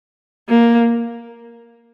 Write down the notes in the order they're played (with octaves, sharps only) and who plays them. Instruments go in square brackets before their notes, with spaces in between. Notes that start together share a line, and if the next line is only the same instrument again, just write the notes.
[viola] A#3